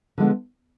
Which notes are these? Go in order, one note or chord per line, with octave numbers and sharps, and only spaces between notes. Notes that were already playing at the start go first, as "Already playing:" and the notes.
D3 F3 G#3 B3